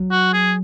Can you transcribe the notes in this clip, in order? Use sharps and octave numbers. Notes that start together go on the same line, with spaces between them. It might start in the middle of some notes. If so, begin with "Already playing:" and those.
Already playing: F#3
F#4
G#4